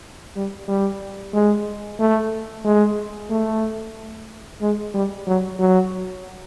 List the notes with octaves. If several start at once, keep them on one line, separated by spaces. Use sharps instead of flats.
G3
G3
G#3
A3
G#3
A3
G#3
G3
F#3
F#3